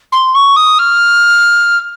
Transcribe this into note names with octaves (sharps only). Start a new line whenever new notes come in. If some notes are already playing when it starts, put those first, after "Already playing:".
C6
C#6
D#6
F6